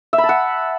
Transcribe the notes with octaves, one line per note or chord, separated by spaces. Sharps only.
E5
B5
A5
F#5